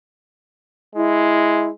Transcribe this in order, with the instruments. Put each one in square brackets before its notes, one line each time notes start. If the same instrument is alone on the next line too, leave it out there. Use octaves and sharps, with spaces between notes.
[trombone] G#3 [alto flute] E4